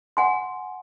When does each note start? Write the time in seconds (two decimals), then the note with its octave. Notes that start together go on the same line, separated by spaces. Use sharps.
0.17 F#5 G#5 C6